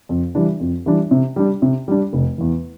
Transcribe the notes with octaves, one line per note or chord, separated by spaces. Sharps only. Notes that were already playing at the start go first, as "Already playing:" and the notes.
F2
E3 G3 D4
F2
E3 G3 D4
C3
G3 D4
C3
G3 D4
F1
E2 E3